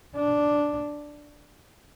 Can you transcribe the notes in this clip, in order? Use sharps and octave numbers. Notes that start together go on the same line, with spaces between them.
D4